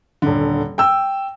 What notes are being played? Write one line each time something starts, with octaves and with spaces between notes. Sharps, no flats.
D#1 D3
G5 E6